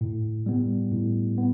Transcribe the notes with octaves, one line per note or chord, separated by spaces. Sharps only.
A2
G3 B3
A2
B3